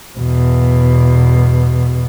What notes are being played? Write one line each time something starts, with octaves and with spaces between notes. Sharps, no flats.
E2 B2